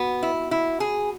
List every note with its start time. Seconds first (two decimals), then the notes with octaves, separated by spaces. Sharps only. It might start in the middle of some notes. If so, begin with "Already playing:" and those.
Already playing: B3 F#4
0.23 E4
0.51 E4
0.80 G#4